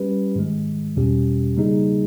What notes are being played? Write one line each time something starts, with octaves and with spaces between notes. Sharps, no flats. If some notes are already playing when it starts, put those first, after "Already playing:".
Already playing: G3 C#4 G4 B4
G#2 D#3 G#3
E2 B2 G3 C#4 G4
C#3 G3 A#3 D#4 G#4